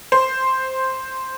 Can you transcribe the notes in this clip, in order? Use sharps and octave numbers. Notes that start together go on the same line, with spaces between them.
C5